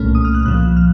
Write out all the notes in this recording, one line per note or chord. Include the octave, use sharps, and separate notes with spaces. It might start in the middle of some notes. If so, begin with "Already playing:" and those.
Already playing: C2 A#2 A3 C#4 F6
D#6
F6
F#6
C2 A#2 F3 F#6
F6